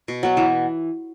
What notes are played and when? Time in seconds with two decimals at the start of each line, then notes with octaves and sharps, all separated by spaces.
0.08 B2
0.23 F#3 B3
0.37 E3